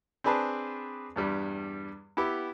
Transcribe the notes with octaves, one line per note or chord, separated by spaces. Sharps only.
C4 D4 G#4 B4 A5
E2 G2 G3
B3 E4 G4